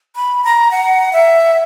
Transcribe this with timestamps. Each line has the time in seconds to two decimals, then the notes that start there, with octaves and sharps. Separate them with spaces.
0.16 B5
0.44 A#5
0.71 F#5
1.13 E5